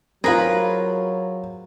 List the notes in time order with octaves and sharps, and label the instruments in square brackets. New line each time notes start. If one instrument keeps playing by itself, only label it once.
[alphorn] F#3 [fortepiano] C4 F4 [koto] G#4 B4 [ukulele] A#4